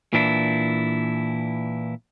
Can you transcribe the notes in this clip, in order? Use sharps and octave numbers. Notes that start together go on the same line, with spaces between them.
A#2 E3 D4 E4